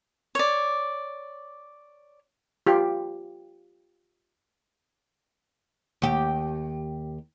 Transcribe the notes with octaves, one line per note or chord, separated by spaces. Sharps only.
C#5 D5
F4 G4
D#2 G4